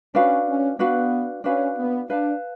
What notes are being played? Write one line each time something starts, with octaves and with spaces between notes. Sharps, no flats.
C#4 D4 F#4 B4 F5
C#4
B3 D4 F#4 B4 F5
C#4 D4 F#4 B4 F5
B3
D4 B4 F5 A5